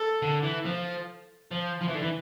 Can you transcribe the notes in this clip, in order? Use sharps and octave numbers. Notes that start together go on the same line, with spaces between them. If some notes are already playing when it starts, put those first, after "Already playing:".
Already playing: A4
D3
E3
F3
F3
F3
E3
D3
E3